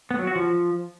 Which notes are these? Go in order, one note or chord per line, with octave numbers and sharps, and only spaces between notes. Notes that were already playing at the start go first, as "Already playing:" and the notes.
B3
F#3
F#4
F3